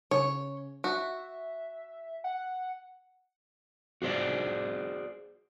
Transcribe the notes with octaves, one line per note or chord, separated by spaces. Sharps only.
C#3 C#5
F#4 E5
F#5
F#4 G#4 C5 D5